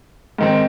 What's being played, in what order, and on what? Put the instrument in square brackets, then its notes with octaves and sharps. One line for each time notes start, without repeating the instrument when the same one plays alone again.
[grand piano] G#2 D#3 C4